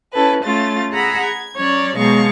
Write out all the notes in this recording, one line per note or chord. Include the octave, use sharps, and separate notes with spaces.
C#4 E4 A4 B4
A3 C#4 F4 A6
G#4 D#5 F#5 A#5 B5 E6
G#6
F#3 C#4 C#5 D5
B2 F#3 G#3 F5 C#6